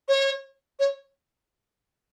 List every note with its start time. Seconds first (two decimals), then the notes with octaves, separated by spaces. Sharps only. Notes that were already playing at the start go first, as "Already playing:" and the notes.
0.09 C#5
0.80 C#5